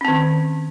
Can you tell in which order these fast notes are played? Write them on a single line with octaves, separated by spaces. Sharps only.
C#4 C4 D#3